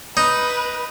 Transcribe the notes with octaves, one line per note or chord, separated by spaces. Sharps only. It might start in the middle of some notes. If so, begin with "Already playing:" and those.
D#4 B4